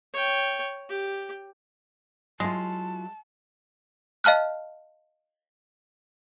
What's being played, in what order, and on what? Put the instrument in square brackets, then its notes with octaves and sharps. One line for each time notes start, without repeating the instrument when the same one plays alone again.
[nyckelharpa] C#5 G5
G4
[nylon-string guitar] F#3 E4 F4 [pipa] G#3 [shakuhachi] A5
[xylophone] D#5 F5 A5 F6 F#6